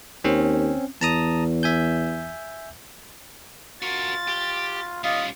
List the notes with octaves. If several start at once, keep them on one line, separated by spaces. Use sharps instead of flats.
D#2 C4 C#4
E2 A5 A#5 D#6
E5 G#5 G6
F4 F#4 A#4 A6
G4
G3 C#4 F4 D#5